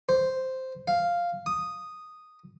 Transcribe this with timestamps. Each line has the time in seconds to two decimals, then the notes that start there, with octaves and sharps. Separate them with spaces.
0.09 C5
0.88 F5
1.46 D#6